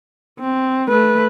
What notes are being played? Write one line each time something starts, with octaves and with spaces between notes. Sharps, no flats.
C4
A3 B4